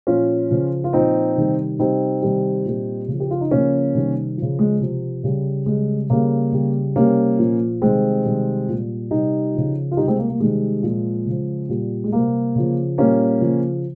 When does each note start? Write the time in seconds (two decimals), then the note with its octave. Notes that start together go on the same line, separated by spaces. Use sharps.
0.07 A#2 F3 C#4 F4
0.50 C#3 F3
0.84 F4
0.93 A#2 F3 C4 D#4
1.36 C3 D#3 G3
1.79 C3 G3 C4 D#4
2.22 C3 D#3 G3
2.65 A#2 G3
3.08 C#3
3.13 F3
3.20 G4
3.31 F4
3.41 D#4
3.51 C#3 F3 A#3 C#4
3.95 C3 D#3 G3
4.37 C#3 F3
4.59 G#3
4.80 C3 F3
5.24 C#3 G3
5.66 C#3 G3 G#3
6.10 C#3 G3 A#3
6.53 C#3 G3
6.96 C3 G3 A#3 C#4
7.39 A#2 F3
7.82 C3 D#3 G3 G#3 C4
8.25 C3 D#3 G3
8.68 A#2 G3
9.11 C3 G3 D#4 G4
9.54 C#3 F3
9.91 F4
9.97 G3 D#4 G4
10.01 C3
10.08 G#3 C4
10.19 A#3
10.29 A#3
10.40 C3 D#3 G3 G#3
10.83 A#2 F3
11.26 C#3 F3
11.69 A#2 G3
12.04 G#3
12.12 C3 G3 A#3
12.55 C#3 F3
12.98 A#2 G3 A#3 C#4
13.41 C#3 F3